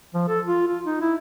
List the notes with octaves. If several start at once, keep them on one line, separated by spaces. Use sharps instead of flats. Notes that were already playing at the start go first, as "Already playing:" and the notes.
F3
A4
F4
F4
D#4
E4